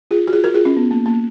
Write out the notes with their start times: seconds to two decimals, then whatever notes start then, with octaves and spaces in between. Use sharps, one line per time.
0.11 F4 G#4
0.28 F#4
0.33 F4 G#4
0.44 F#4 A#4
0.54 F4 G#4
0.65 C#4
0.77 B3
0.91 A#3
1.06 A#3